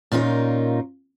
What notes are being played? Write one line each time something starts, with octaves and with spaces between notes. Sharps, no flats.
A#2 C#4 D#4 F4 A#4